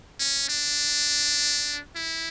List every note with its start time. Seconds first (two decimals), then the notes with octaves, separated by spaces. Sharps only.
0.20 C#4
0.49 D4
1.96 E4